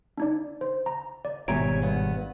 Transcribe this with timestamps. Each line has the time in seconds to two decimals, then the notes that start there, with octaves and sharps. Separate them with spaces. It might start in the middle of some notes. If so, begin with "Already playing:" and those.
0.18 D4 D#4 D5
0.61 C5
0.86 A#5
1.25 D5
1.48 G#1 B2 G3 C#5 E5 G#5 A#5 D7
1.82 G2 B3